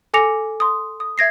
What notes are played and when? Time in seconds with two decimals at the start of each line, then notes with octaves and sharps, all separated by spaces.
0.14 A4 G#5 D6 A#6 C#7 F7
0.60 C6 D#6
1.00 D#6
1.18 E5 G#6 A#6 C7